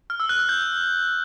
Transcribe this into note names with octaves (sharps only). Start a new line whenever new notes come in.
F6
E6
F#6
E6
G6